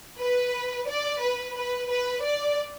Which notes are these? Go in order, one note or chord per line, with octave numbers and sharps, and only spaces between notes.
B4
D5
B4
B4
B4
D5